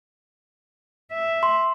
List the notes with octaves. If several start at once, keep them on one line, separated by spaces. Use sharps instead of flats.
E5
C6